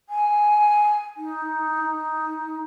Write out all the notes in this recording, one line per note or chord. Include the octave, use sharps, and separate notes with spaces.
G#5
D#4